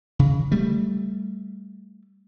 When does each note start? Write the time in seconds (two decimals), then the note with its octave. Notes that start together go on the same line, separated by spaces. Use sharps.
0.19 C#3
0.52 G3 A3